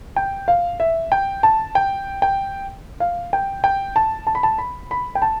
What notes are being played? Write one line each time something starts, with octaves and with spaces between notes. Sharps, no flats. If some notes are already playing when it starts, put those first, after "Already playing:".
G5
F5
E5
G5
A5
G5
G5
F5
G5
G5
A5
A5
B5
A5
B5
B5
G5
A5